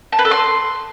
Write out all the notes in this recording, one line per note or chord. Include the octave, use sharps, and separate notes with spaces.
A5
B4
A4
C6